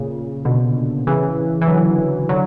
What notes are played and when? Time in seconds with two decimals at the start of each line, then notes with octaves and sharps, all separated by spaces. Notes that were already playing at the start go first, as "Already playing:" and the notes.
Already playing: A#2 C#3
0.45 B2 D3
1.07 C#3 E3
1.61 E3
1.68 D3 F#3
2.29 D3 F#3